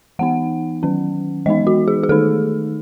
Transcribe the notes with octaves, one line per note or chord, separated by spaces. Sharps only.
E3 B3 D#4 F#5
D#3 F#3 C#4
E3 G#3 B3 D#4 D#5
F#4
G#4
G#4
D#3 A3 D#4 A4